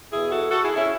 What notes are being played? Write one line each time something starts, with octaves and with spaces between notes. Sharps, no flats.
E2 B2 E4 G#4
F#4 A4
F#4 A4
E4 G#4
C#4 E4